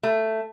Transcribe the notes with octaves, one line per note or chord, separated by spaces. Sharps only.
A3